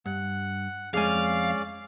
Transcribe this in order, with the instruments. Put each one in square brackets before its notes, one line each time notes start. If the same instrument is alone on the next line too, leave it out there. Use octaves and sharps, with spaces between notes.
[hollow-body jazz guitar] G2 [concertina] F#5
[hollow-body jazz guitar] F2 G#5 [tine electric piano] G#3 G#4 [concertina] C#4 D5 [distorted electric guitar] F5